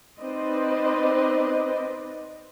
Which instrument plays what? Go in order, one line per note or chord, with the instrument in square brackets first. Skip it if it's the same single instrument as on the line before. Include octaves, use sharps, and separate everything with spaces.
[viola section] C4 D#4 B4 C5 D5 D#5